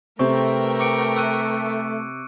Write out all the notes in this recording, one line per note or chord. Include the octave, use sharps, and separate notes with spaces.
C3 A3 C4 A#4 B4 G5 C#6
D6 C#7 D7
E6 F#6 D#7